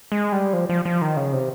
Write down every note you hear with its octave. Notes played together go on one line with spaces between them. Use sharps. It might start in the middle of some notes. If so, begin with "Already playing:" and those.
G#3
G3
F3
F3
F3
D#3
C#3
C3